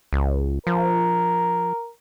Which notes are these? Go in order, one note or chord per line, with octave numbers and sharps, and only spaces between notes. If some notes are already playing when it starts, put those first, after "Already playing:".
C#2
F3 A#4